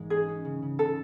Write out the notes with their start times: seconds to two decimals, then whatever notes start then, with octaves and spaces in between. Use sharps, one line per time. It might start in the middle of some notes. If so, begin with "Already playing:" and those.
Already playing: G#1 G#2 E3 G#3
0.10 C#4 G#4
0.28 C#4
0.45 C#3
0.62 C#3
0.79 C#3 A4